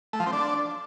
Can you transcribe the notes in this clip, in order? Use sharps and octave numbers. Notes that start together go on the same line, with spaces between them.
A3
F3
C4
D4